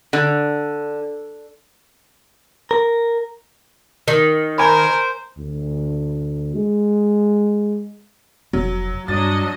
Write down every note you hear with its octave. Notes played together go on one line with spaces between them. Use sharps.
D3
A#4
D#3
A#4 C5 G#5 B5
D2
G#3
F1 F#3
G2 F#3 D4 D#5 A6